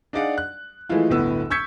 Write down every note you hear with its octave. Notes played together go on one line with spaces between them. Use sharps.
D4 D#4 G#4 D5 F5 F#5
F#6
E3 F3 G#3 A3 E4 F4
D1 G1 A2 B3 E6
C#6 E6 G6 G#6 B6 C#7